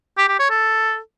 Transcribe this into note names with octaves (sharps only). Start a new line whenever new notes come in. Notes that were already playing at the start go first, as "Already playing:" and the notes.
G4
G4
C#5
A4